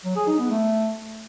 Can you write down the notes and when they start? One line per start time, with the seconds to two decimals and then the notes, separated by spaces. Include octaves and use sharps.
0.05 F#3
0.16 G#4
0.27 D#4
0.39 B3
0.50 A3